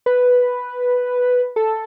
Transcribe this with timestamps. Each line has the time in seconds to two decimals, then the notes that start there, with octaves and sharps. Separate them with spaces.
0.06 B4
1.56 A4